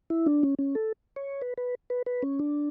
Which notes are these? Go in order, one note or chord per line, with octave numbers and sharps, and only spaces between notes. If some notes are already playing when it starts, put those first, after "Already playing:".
E4
D4
C#4
C#4
A4
C#5
B4
B4
B4
B4
C#4
D4